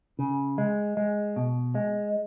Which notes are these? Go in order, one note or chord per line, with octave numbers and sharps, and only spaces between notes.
C#3
G#3
G#3
B2
G#3